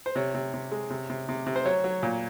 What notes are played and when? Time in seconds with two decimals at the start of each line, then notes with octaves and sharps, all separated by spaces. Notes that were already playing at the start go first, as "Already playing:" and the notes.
0.06 C5
0.15 C3 C#5
0.34 C3
0.54 C3
0.72 G#3
0.90 C3
1.10 C3
1.29 C3
1.47 C3
1.56 C5
1.65 F#3 C#5
1.84 F#3
2.03 A#2